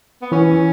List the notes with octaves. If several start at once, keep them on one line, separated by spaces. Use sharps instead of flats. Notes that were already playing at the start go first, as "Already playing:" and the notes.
B3
E3 C#4